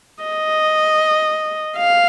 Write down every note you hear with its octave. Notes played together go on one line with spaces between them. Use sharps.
D#5
F5